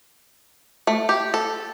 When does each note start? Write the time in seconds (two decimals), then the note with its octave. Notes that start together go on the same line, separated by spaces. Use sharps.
0.87 A3
1.09 G4
1.34 A4